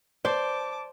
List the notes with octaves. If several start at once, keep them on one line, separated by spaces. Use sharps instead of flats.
C5 D5 A5 D6